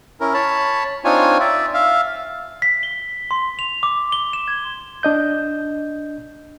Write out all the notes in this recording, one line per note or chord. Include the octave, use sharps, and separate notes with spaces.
C#4 E4 A#4
C#5 A5 B5
C4 D4 D#4 F4 C#5 G#5
D5 E5
E5 F5
B6
G7
C6
F7
D6
G7
E7
G#6
D4 D#5 G6